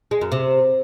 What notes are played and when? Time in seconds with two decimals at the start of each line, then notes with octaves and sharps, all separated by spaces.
0.11 G#3
0.21 F#2
0.32 C3